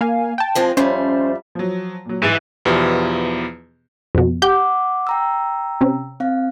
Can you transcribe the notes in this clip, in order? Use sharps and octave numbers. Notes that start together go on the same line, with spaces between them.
A#3 F5 G#5
G5 A5
F3 G#3 C4
F2 G3 A3 C#4 C5
F3 F#3
A#2 F#3
G#2 E3 A6 D#7
E2 B2 F3 B3 E4 G4
F2 B2
G4 F#5 D6 G6
G5 A#5 E6
C3 C#4
C4 F5